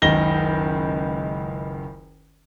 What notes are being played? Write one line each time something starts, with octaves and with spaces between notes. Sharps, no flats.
F#1 C#2 D#3 A#6 G7